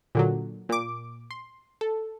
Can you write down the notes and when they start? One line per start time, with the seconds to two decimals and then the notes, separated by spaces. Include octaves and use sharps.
0.15 A#2 D3 F#3
0.69 A#2 D6
1.31 C6
1.81 A4